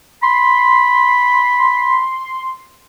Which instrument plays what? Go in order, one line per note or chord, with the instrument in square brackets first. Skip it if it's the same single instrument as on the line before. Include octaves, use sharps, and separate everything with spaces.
[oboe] B5 [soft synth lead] C6